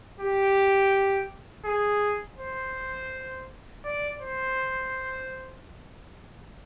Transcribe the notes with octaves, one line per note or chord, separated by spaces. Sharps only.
G4
G#4
C5
D5
C5